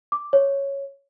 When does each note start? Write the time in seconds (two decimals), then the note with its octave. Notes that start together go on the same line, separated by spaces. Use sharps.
0.12 D6
0.33 C#5